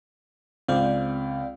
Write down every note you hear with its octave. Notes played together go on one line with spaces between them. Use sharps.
C#2 C4 D5 F5